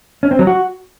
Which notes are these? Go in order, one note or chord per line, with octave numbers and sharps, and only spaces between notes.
C#4
C4
F#3
F#4